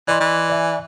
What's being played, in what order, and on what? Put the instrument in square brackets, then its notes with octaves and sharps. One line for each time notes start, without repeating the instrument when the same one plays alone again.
[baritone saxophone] E3 [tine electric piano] D5 D#5 C6
[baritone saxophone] E3
[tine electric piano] D5 E5 G#5